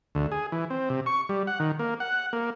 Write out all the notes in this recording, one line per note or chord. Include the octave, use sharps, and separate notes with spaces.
D2
G#4
E3
C4
C3
C#6
G3
F#5
D#3
A#3
F#5
A#3